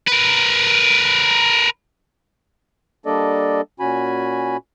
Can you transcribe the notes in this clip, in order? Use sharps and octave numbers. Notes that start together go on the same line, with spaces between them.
A#4 B4
G3 A#3 D4 A4 D5 D#5
A#2 C#4 F#4 G#5 B5